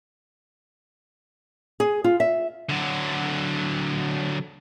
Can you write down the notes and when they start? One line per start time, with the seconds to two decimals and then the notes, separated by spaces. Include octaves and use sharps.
1.80 G#4
2.04 F4
2.20 E5
2.69 D3 F#3